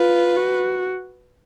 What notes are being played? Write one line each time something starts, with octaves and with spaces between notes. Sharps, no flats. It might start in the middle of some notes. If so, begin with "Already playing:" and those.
Already playing: F4 B4
F#4